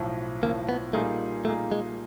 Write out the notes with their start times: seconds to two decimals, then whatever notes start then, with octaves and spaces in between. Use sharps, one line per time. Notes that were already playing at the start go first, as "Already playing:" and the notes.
Already playing: B1 A2 F3
0.43 B1 A2 F3 A#3
0.69 B3
0.93 A#2 G3 A3 A#3 D#4 G#4
1.45 A#2 G3 A3 A#3 D#4 G#4
1.72 G#3